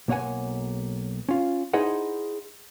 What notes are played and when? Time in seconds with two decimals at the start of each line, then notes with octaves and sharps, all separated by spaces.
0.08 B1 A#3 C#5 F#5 G#5
1.29 C#4 F4
1.73 D#4 E4 G#4 C5 D#5 F#5